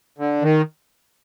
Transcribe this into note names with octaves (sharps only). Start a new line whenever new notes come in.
D3
D#3